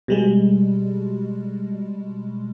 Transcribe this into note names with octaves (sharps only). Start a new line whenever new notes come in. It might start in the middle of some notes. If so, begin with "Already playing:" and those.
B2 G3 G#3